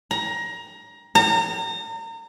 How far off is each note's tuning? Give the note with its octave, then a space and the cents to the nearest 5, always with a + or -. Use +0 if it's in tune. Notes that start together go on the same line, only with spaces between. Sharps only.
A#5 +20
A#5 -35